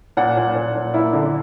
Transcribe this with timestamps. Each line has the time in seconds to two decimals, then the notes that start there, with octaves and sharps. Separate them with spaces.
0.17 A#2 F#5
0.37 A#2
0.55 A#2
0.75 A#2
0.94 A#3 E4
1.13 D3